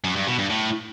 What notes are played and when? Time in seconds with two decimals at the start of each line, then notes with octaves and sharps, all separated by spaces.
0.04 F#2
0.16 G2
0.27 B2
0.39 G2
0.50 A2